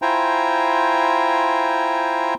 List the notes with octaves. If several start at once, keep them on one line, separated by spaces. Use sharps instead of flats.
E4 F4 C5 G5 G#5 A#5